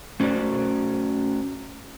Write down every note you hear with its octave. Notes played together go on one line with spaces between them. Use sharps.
A3 C#4 F#4 C5 D5